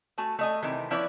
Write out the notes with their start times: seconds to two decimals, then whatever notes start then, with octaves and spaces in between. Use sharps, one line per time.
0.18 A3 F#4 G#5 A5
0.39 A3 D#5 G#5
0.62 C3 D#3 E3 A3
0.90 F3 B3 E4 B4 C#5 D5